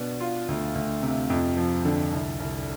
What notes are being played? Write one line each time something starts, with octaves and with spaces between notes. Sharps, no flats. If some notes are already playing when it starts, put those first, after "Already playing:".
Already playing: B2 B3 D4
F4
D2
D2
C3
F2
F3
D3
C2
C2